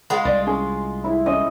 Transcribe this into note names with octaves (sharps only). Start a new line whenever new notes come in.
G#3 F4 F#5 B5
C2 D5
C#4 G#4
E4
C#4 D#5